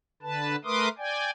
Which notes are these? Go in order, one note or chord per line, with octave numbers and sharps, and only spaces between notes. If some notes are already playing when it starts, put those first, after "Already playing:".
D3 B4 A5
A3 A#4 B4 C6 D6 D#6
D5 G5 G#5